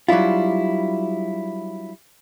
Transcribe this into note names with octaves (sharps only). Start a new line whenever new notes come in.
F#3 G3 D4 E4 F4